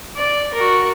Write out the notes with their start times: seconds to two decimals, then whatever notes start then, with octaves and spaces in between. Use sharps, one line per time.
0.17 D5
0.54 F#4 A#4